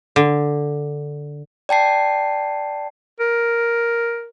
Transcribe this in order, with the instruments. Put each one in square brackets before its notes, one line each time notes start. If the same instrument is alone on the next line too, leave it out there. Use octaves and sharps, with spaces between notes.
[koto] D3
[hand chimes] D5 G5 A5 C7
[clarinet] A#4